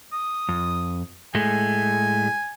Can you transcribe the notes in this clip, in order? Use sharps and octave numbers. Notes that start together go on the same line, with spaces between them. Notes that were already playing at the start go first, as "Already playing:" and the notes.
D#6
F2
A2 G#3 A3 G#5